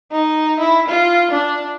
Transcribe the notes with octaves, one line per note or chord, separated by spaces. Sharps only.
D#4
E4
F4
D4